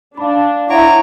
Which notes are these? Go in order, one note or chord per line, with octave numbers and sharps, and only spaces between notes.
D4 F5 B5
E4 C#5 F#5 A#5 C#6 D7